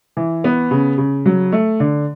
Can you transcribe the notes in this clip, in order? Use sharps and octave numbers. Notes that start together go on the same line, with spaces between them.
E3
B3
C#3
C#3
F#3
A3
D3